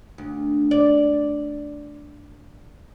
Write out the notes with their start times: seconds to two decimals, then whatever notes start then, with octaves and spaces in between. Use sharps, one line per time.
0.18 D2
0.71 D5